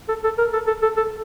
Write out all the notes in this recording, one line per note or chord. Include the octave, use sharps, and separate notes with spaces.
A4
A4
A#4
A4
A4
A4
A4